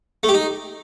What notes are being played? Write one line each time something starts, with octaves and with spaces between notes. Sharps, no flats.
A3
G4
D#4